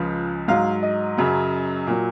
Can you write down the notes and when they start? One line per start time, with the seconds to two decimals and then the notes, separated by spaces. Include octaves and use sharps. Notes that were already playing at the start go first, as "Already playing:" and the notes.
Already playing: C#2 C#3 F3 G#3 F5
0.48 G#2 F#3 F5
0.83 D#5
1.17 F#2 C#3 F#3
1.87 A#2 F#3